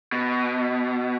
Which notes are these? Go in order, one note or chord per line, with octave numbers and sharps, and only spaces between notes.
B2